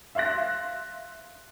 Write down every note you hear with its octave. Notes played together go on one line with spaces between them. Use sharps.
E5 F5 C6 F#6 A#6